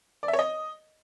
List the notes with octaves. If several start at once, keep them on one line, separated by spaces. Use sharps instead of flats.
D5
E5
C#5
D#5